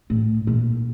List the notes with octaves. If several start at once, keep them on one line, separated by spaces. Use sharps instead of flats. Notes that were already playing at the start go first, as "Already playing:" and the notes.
A2
A#2